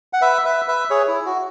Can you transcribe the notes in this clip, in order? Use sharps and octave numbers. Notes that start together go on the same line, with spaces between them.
F#5
B4 E5
B4 E5
B4 E5
G#4 C#5
E4
F#4